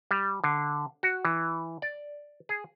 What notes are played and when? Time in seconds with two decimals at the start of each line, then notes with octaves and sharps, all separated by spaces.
0.11 G3
0.44 D3
1.03 F#4
1.25 E3
1.82 D5
2.49 G#4